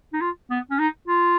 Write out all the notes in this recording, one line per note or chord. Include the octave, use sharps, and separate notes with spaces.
D#4
F4
B3
C#4
D#4
F4